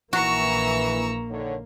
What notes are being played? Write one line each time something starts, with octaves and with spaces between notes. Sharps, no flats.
A#1 E3 A#3 F#4 A#5 C#6 E6
D3 D#3 C#5